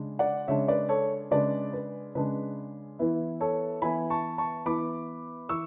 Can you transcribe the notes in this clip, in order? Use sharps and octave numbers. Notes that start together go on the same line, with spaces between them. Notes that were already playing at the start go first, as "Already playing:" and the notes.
Already playing: C#3 G#3 D4
D5 F#5
C#3 G#3 D4 C#5 E5
B4 D5
A4 C#5
C#3 G#3 D4 B4 D5
B4
C#3 G#3 D4 B4
E3 B3 E4
A4 C#5
E3 B3 E4 G#5 B5
A5 C#6
A5 C#6
E3 B3 E4 B5 D6
E3 C#6 E6